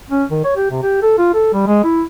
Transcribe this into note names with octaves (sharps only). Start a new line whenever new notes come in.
C#4
D#3
C#5
G4
C3
G4
A4
F4
A4
G3
G#3
E4